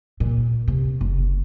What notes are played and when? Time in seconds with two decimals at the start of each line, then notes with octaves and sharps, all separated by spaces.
0.20 A#2
0.68 C3
1.01 F#1